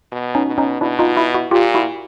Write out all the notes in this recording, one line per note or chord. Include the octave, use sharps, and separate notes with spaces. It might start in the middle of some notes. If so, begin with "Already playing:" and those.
B2
C#4 D#4
B2
C#4 D#4
B2 D4 E4
D#4 F4
E4 F#4
E4 F#4
A#2 F4 G4
E4 F#4